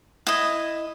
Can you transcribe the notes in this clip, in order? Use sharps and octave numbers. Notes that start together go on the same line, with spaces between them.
E4 D#5